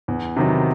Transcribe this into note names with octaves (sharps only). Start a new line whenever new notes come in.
E2
C3 D#3 F#3 B3